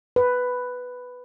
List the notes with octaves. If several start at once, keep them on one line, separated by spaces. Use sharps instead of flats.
B4